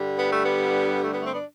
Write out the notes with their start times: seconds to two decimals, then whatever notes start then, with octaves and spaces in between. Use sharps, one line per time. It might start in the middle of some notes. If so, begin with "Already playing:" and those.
Already playing: G2 D3 G3
0.18 B3
0.31 A3
0.43 B3
1.01 A3
1.11 B3
1.22 A3 C4
1.33 B3 D4